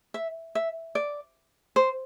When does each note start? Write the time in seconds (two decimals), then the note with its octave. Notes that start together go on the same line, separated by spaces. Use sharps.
0.14 E5
0.55 E5
0.95 D5
1.76 C5